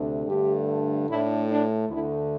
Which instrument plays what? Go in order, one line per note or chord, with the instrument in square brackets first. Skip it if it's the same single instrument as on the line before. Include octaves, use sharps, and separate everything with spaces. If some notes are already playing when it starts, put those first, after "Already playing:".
Already playing: [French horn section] D2 C3 A3 D4
G2 D3 A3 D4 G4
A2 A3 D4 E4
D4
D2 D3 A3 E4